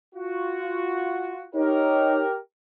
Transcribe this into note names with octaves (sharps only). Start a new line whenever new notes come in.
F4 F#4
D#4 G4 A#4 C#5